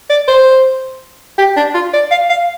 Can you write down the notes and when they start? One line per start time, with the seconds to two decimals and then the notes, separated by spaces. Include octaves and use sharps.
0.10 D5
0.28 C5
1.38 G4
1.57 D4
1.74 F4
1.93 D5
2.11 F5
2.30 F5